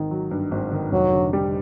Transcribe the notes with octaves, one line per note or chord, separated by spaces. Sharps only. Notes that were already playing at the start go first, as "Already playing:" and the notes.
Already playing: G#1 D#3
F#3
G2
G#1
D#3
F1 F#3
D3
G3